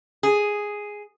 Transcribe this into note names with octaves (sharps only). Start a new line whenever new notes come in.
G#4